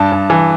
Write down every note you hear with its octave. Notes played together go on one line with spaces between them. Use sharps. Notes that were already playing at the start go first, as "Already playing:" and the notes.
Already playing: G2 A5
G2
E3